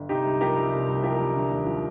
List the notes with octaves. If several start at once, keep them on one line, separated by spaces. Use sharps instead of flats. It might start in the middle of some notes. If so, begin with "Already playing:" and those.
Already playing: G1
C3 D#4 G4
C2
F3 G4 A#4
C2
C3
C2
F3 G4 A#4
C2
D3
D#2
F3